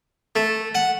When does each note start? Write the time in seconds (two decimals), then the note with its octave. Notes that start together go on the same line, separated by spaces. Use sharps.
0.36 A3
0.75 F#5